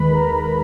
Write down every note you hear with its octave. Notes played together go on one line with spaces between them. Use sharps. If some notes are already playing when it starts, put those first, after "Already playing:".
Already playing: D#2 D#3 G#3 B4 B5
A#4 A#5